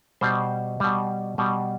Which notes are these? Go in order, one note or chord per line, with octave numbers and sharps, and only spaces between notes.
B2 G3 C5
B2 G3
B2 G3